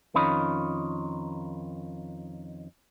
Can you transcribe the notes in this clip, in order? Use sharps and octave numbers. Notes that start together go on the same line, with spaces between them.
F2 D#3 C#4 F4 D#5 B5